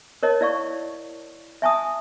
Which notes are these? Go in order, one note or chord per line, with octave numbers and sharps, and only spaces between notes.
A#4 C#5 D#5 A5
E4 D5 F5 C#6
E5 G#5 A5 D#6